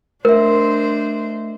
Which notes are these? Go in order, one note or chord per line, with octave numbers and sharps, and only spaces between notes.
A3 D4 A#4 C5 E5